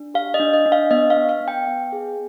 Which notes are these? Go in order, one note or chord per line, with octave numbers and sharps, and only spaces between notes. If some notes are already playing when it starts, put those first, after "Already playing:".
Already playing: D4
G4 F5
D#5
D4
D#5
D4
F5
B3 D#5
F5
B3
F5
B3
G5
B3
G#4